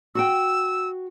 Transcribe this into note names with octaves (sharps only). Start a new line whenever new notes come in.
F#4 F#5 G5 E6